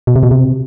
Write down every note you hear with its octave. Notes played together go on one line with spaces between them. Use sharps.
B2
C3
B2
C3